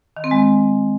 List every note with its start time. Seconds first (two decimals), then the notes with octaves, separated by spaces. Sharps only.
0.17 D#3
0.24 C4
0.31 G#3